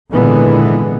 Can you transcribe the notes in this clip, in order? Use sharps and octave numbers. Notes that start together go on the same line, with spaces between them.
G#1 A#2 D3 E3 G#3 B3